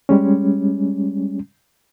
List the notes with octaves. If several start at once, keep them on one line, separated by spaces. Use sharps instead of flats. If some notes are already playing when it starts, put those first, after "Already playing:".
G3 G#3 C#4